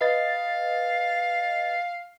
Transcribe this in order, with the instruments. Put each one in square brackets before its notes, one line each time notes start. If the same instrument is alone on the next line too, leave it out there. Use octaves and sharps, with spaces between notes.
[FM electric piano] B4 D#5 A6 [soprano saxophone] F5